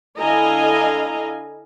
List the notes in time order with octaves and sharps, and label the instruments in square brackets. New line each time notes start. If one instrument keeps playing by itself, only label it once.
[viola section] D3 E4 D#5 F5 G#5 A#5